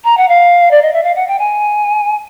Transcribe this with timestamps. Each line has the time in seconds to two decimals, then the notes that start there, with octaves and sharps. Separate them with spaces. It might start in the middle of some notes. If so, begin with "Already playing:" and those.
0.04 A#5
0.17 F#5
0.29 F5
0.71 D5
0.82 D#5
0.93 E5
1.03 F5
1.15 F#5
1.28 G5
1.39 G#5